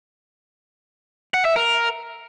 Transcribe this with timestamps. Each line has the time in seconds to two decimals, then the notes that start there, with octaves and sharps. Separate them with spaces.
1.34 F#5
1.45 E5
1.56 A#4